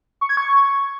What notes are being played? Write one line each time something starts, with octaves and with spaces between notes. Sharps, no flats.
C#6
G#6
C#6